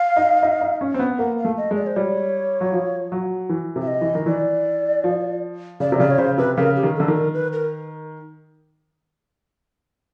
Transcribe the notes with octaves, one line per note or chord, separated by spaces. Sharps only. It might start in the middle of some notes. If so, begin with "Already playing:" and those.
Already playing: F5
D#4
D#4
D#4
C#4
C4
B3
A#3 F#5
F5
A3
D#5
G#3
D5
C5
G3 C#5
F#3
F3
F#3
E3
C3
E5
D#5
E3
D#3
E3 D5
F3
C#3 D5
C3
C#3 D5
C#5
C#3 C5
C3 B4
C#3 A#4
G4
D#3
D3 A4
D#3
A#4
B4
A#4